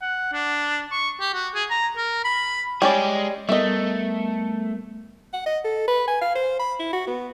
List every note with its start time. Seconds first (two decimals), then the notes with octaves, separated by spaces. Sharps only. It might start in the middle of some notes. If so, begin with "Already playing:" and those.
0.01 F#5
0.33 D4
0.91 C#6
1.20 G4
1.34 F#4
1.55 G#4
1.70 A#5
1.97 A#4
2.24 B5
2.82 G3 G#3 C#4 G#4 D5
3.49 G3 A3 B3 A#4 D#5 E5
5.33 F#5
5.46 D#5
5.65 A4
5.88 B4
6.07 G#5
6.21 F5
6.35 C5
6.59 B5
6.79 E4
6.93 F#4
7.07 B3